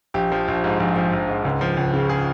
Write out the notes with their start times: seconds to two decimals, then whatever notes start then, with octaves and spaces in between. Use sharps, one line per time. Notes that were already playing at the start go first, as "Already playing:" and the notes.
0.14 A#1 G4
0.32 F3
0.48 A#1
0.64 G#2
0.80 A#1
0.96 F3
1.13 A#1
1.28 G#2
1.45 C#2
1.61 F3
1.77 C#2
1.93 C#3
2.09 G#4